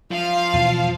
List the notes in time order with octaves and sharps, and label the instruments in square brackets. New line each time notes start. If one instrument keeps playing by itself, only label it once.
[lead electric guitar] F3 [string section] F5
[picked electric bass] E2 B2